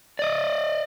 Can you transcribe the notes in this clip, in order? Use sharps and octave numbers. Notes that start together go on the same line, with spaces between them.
D5 D#5